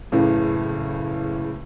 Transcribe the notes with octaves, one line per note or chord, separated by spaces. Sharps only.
F#1 A2 C#3 E3